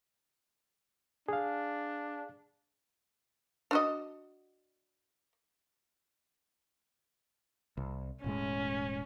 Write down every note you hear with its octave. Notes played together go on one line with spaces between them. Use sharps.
D4 G#4 F5
D4 F#4 D#5
C2
E1 A2 G#3 C#4